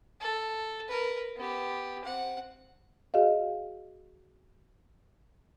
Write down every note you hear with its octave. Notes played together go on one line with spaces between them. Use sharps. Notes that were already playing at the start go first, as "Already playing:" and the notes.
A4
A#4 B4
B3 G4
C4 F#5
F#4 G#4 D#5 F5